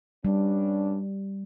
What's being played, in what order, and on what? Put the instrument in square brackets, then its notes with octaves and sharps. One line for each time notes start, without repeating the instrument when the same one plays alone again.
[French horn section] G2 C#4 D4 [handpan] G3